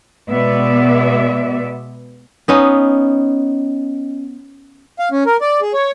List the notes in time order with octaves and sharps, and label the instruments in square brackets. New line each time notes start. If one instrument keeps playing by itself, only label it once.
[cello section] B2 G#3 B3 D5 E5
[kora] B3 C#4 D#4
[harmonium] F5
C#4
A#4
D5
G#4
C#5